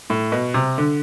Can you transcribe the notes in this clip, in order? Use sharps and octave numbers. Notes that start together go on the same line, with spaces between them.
A2
B2
C3
D3